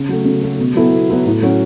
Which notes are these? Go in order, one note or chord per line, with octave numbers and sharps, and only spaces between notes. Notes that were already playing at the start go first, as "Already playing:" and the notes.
Already playing: C#3
F#3 A3
C#3
F#3 A3
B2
F#3 B3 E4 A4
B2
F#3 B3 E4 A4
A2
F#3 C#4